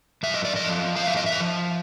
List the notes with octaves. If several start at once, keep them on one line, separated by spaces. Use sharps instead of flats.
F#2 E5
D#5
D5
F3 D#5
F#2 F5
E5
D#5
E5
F3